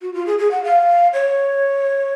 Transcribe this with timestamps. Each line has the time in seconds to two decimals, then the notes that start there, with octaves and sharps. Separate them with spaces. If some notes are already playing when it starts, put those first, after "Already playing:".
0.02 F#4
0.14 F4
0.26 G#4
0.38 G#4
0.51 F#5
0.63 F5
1.13 C#5